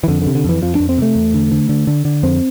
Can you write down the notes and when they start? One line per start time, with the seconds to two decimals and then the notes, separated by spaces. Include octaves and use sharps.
0.04 E3
0.08 F2 D3
0.22 D3
0.27 C3
0.35 D3
0.45 F2 E3
0.62 F2 F3
0.75 D4
0.80 F2
0.89 C4
0.98 C3 A3
1.15 E2
1.34 D3
1.52 D3
1.69 D3
1.87 D3
2.05 D3
2.23 F2 C4